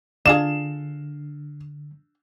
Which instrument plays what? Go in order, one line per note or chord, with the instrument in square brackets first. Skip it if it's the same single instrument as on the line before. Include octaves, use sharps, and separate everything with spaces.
[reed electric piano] D3 [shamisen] D4 F4 G#4 [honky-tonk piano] E7